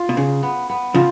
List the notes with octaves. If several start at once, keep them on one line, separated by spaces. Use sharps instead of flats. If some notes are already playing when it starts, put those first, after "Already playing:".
Already playing: F4
B2
C#3 G#4
B3
B3
C#3 F3 F4